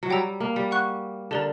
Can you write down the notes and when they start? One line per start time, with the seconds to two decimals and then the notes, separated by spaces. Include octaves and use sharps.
0.03 F#3
0.10 G3 C#5 G5 A#5 E6
0.40 A#3
0.56 G3
0.71 F#5 C#6 F#6
1.31 D3 G4 A#4 D5 A#5